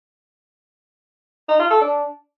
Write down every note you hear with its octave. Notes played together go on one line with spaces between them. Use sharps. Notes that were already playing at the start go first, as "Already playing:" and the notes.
D#4
F4
A4
D4